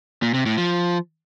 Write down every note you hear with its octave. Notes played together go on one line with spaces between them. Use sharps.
A#2
C3
A2
F3